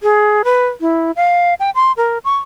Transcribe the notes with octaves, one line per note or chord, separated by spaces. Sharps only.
G#4
B4
E4
F5
G5
C6
A#4
C#6